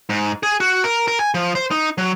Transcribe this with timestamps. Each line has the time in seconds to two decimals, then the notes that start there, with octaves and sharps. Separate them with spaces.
0.09 G#2
0.43 G#4
0.60 F#4
0.84 A#4
1.08 A#4
1.19 G#5
1.34 F3
1.55 C5
1.71 D#4
1.98 F#3